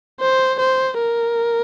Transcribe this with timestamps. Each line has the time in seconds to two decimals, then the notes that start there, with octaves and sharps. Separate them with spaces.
0.20 C5
0.60 C5
0.99 A#4